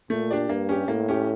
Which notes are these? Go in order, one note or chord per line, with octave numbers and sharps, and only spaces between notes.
A#2 A3
D4 G4 D5
G2 A#3
C#4 G4
A2 A#3
C#4 G4